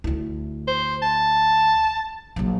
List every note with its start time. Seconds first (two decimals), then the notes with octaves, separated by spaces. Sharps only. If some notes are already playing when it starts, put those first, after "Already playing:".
0.04 D2 E4
0.68 C5
1.02 A5
2.36 A#1 F#3